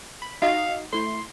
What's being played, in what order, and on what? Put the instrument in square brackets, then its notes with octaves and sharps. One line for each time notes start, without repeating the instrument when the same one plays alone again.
[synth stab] B5
[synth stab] D#4 F#4 D#5 [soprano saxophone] F5
[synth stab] A3 E4 [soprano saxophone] C6